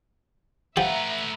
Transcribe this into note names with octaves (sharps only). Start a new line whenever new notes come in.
F3 A3 G4 B4 E5 F#5 A#5